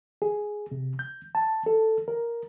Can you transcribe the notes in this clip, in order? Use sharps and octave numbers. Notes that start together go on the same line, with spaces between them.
G#4
C3
G6
A5
A4
A#4